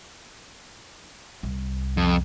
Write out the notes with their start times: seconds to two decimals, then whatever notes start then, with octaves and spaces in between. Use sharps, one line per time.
1.43 C2
1.97 F2